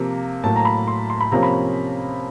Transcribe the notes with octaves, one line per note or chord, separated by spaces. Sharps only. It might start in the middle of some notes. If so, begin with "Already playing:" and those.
Already playing: C3 F3 A#3
A2 F#3 A#3 A5
A#5
B5
C6
C6
B5
C3 F3 A#3 C#4 A#5
B5